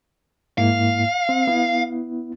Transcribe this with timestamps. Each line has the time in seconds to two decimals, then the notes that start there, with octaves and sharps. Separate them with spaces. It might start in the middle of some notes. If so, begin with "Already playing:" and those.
0.58 G#2 A#3 E4 F5
1.29 C4
1.47 B3 E4